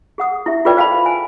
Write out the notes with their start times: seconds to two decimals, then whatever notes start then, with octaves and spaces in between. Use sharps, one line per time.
0.18 G#4 F#5 D#6
0.46 E4 G4 E5
0.65 F4 G#4 A4 B4 D5 G5
0.77 C5 F5 G5 A5 B5
1.06 G#5